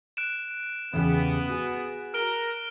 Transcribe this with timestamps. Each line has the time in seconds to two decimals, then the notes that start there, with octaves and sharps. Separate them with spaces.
0.17 F#6 D7 E7
0.93 E2 C#3 B3 G4
1.48 F#4 G#4
2.14 A#4 F6 D7 G7